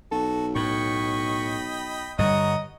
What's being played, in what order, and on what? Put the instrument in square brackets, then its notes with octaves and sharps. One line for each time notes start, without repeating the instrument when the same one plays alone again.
[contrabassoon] B1 [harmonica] F#4 [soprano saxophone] A4
[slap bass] A2 [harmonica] D#5 G5 B5 [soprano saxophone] C#6
[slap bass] G2 D3 G3 [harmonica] C#5 F#5 A#5 [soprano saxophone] D#5